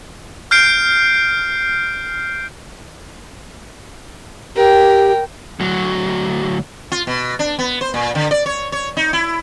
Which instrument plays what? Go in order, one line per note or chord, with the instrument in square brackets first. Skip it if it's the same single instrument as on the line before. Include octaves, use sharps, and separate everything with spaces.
[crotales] F6 G6 C7 D7
[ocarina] G4 [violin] A#4 G5
[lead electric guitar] D2 F#3
[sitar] F4
B2
D4
B3
C5
A#2
D3
D5
C#5
C#5
D#4
E4